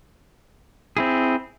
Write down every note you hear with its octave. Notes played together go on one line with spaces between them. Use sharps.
C4 E4 G#4